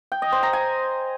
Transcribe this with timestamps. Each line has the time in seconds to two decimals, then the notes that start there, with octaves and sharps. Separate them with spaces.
0.12 G5
0.22 D#5
0.32 C5
0.43 A#5
0.53 G#5